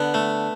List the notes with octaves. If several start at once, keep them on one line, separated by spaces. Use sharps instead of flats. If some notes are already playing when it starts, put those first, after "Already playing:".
Already playing: D3 B3
A3